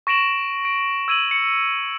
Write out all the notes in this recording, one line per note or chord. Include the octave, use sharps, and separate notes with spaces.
C#6 A#6 D7 E7 F#7
D7
E6 G#6 D#7 E7 F#7
C#7